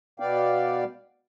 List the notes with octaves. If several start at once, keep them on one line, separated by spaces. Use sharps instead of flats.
B2 B3 D5 F5 G5